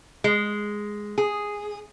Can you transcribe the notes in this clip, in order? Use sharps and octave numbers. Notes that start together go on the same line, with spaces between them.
G#3
G#4